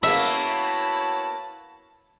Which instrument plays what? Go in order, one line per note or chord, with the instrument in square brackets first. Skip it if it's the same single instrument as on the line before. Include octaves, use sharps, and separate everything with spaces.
[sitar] A#3 B3 [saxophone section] E4 F#4 C#5 [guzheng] E5 [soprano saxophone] A5